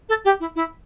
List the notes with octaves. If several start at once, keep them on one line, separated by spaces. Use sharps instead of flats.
A4
G4
E4
E4